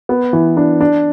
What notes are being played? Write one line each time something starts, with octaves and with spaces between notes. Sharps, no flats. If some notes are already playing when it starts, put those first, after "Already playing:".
B3
E3
D4
D4